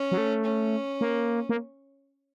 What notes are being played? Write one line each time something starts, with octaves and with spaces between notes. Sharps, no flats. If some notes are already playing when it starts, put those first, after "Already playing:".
Already playing: C#4
F#3
A3
C#4
A#3
A#3